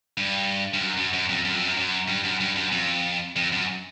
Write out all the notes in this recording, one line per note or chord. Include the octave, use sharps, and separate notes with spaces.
G2
G2
F#2
F#2
F#2
F2
F#2
F2
F#2
F#2
G2
F#2
G2
F#2
F2
F2
F#2